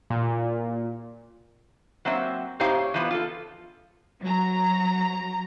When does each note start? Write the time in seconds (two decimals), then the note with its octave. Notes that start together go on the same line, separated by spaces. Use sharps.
0.10 A#2
2.05 F#3 A#3 C4 C5 D5 E5
2.60 A2 C4 D#4 G4 C5 F5
2.78 C#5
2.94 E3 F3 B3
3.11 F4 A4
4.21 F#3 A#5